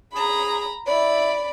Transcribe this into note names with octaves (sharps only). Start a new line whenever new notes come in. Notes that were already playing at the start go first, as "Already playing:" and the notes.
G#4 A#5 B5
E4 D5 B5